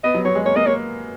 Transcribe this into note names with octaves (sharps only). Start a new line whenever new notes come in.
B3 D#5
F#3
F#3 C#5
G#3
A#3 C#5
A#3 D#5
A#3 C#5